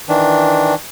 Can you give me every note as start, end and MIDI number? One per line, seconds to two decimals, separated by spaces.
0.09 0.74 51
0.09 0.74 52
0.09 0.74 62